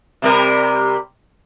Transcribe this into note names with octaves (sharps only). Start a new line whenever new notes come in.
C3 G3 A#4